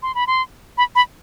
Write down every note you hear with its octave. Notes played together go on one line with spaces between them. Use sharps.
C6
B5
C6
B5
B5